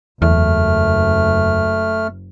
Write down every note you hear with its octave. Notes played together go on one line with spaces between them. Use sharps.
F#1 E2 A3 F6